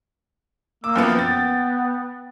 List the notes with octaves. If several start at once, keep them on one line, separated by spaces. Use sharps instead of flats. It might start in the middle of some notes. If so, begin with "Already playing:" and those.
A#3 D6 E6
F#2 F3 B3 G5
B3 A6